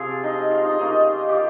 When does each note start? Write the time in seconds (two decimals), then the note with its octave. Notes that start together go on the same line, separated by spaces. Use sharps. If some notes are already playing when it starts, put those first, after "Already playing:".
Already playing: C3 F3 C4 F4 G#4
0.24 D#4
0.51 F4
0.65 D#4
0.79 C#3 G3 A#3 C#4 D#4
1.29 G4
1.34 F4